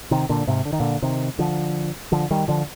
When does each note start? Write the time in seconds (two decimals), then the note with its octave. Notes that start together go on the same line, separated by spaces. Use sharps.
0.11 C3 D#3
0.29 A#2 D3
0.47 G#2 C3
0.65 D3
0.73 D#3
0.80 A#2 D3
1.02 C3 D#3
1.39 D3 F3
2.12 D3 F3
2.31 D#3 G3
2.48 D3 F3